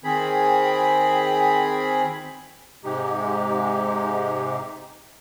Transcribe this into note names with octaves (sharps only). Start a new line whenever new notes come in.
D#3 C4 G#4 B5
G#2 C3 G#3 D#4 G4